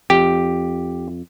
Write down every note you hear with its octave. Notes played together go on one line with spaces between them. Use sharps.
F2 G4